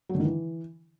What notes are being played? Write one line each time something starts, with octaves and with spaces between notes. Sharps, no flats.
F#3
D3
D#3
E3